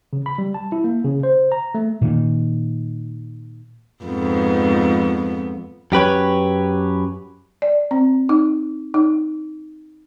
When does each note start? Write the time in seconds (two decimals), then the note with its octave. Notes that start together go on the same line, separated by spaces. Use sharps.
0.13 C#3
0.26 B5
0.38 G3
0.54 A5
0.72 E4
0.84 A#3
1.04 C#3
1.23 C5
1.52 A#5
1.75 A3
2.02 A#2 D#3
4.05 F2 G#2 B3
5.92 F#2 G4 B4 C#5
7.62 D5
7.91 C4
8.29 D#4
8.94 D#4